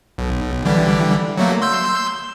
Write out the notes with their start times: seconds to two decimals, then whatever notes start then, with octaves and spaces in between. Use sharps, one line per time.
0.18 B1
0.65 D3 E3 G3
1.37 F#3 A3 A#3
1.62 C6 E6 G6